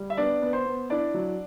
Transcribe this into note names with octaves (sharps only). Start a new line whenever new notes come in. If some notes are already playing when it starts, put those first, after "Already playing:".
Already playing: G3
E5
B3 D4 D5
B3
C5
B3
D4 E4 D5
F#3